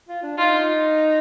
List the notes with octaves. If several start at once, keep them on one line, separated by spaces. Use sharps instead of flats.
F4
D4
D#4 F4